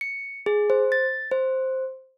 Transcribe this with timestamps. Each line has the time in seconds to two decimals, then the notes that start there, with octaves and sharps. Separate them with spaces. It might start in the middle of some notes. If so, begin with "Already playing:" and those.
0.01 C#7
0.46 G#4
0.70 C5
0.92 A6
1.31 C5